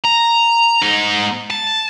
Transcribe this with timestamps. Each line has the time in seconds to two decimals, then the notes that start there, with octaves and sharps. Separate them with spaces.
0.04 A#5
0.82 G#2 D#4
1.50 A5